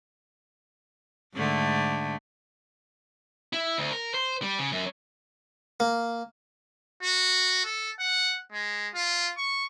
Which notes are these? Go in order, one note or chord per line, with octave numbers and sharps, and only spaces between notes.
G#2 D3 A3
E4
D2
A#4
C5
G3
C#3
F#2
A#3
F#4
A4
F#5
G#3
F4
C#6